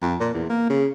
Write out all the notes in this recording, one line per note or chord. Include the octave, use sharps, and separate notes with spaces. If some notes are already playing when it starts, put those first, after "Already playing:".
F2
A#2
E2
A#3
C#3